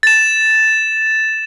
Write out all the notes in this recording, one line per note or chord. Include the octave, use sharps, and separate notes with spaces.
A6 E7